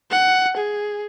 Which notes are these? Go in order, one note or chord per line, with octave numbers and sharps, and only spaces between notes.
F#5
G#4